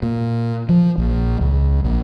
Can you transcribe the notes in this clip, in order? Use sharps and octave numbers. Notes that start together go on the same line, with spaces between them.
A#2
F3
A#1
C#2
A#1